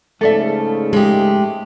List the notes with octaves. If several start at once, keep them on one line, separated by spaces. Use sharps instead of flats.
G#2 C#3 F3 A3 A4 D5 E5
G#3 G4 G#4